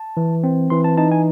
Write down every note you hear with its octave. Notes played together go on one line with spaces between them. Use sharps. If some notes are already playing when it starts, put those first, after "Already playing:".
Already playing: A5
E3
C4
E3 C6
A5
D#4 A5
G#5